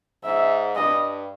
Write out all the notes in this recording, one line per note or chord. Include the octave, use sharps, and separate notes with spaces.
G#2 E5
G2 D#5